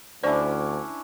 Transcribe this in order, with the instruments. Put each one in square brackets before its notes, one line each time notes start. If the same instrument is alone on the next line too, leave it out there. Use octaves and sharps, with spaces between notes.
[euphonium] D2 [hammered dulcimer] C#4 D4 E4 [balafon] C5 D5